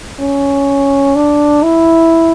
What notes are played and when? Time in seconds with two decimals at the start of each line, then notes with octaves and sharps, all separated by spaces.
0.20 C#4
1.16 D4
1.63 E4